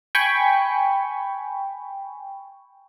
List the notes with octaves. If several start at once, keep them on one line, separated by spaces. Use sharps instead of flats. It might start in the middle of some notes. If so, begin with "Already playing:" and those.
G5 G#5 B5 C#6